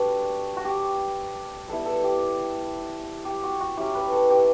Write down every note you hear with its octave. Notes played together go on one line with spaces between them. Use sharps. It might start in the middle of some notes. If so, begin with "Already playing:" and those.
Already playing: G3 D4 F#4 A4 B4
F#4
G4
G3 B3 E4 A4
A4
G4
G4
F#4
F#4
F#3 C#4 E4 G4
B4
A4
G4